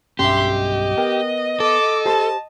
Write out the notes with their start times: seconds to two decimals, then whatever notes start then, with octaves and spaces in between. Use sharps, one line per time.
0.19 B1 G2 C#4 G4 E5 C6
0.54 D#5
0.97 B3 A#4 G5
1.60 A4 D6
2.06 G4 C5 A5 B5